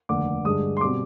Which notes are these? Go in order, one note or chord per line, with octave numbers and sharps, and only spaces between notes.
F1 D#2 D3 D6
G2 D3 G#3 D4 D#6
C6
B2 G3 C4 D6